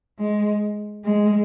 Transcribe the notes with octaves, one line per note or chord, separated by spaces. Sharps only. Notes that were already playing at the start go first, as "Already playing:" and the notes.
G#3
G#3